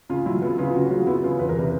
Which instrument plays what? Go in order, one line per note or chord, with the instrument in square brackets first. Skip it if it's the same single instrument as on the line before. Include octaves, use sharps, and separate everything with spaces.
[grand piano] C#3 F4
F#3 E4
B3 F4
C#3 F4
C#3 F#4
F#3 F4
B3 E4
C#3 F4
E2 B4
A#4
C3 B4